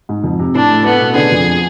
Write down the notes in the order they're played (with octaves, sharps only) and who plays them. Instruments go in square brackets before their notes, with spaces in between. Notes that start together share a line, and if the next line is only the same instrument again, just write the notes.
[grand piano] G#2
F2
C3
[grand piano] A2 [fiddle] D4
[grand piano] A3
[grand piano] A3 [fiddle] B3
[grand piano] B2
[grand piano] D3 [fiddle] G#4
[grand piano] F2